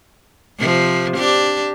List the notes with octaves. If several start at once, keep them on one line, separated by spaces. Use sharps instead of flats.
C3 F3
D4 G4